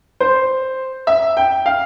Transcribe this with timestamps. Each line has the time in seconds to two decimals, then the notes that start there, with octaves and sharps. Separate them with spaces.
0.20 C5
1.07 E5
1.37 G5
1.66 F5